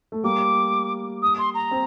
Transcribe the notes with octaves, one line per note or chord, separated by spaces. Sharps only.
A3
G3 A#3 D6
D#6
C6
A#5
C4